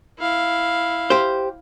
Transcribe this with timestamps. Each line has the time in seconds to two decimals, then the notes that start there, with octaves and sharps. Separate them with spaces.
0.19 E4 F5
1.10 G4 C5